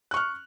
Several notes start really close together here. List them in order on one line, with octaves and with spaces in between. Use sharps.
F#6 C#6 F6